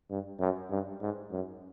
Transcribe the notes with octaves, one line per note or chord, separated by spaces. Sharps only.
G2
F#2
G2
G#2
F#2